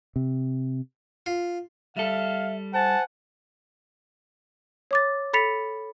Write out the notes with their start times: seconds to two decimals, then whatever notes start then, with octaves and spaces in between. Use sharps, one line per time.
0.16 C3
1.26 F4
1.97 G3 A4 E5 F5
2.74 C5 F#5 G#5 A5
4.91 C#5 D6 A6
5.33 A4 B5 A6 B6 C#7 F7